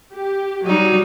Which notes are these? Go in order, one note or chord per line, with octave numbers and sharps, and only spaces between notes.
G4
F#3 G3 D#4